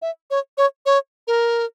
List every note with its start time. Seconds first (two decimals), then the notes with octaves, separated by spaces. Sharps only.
0.02 E5
0.31 C#5
0.58 C#5
0.86 C#5
1.27 A#4